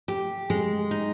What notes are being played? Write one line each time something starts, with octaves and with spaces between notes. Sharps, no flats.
G4
G#3
D#4